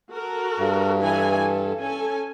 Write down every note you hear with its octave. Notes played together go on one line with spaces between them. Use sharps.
F#4 A4 A#4
G2
E3 A4 G#5
A4
C#4 A4 G#5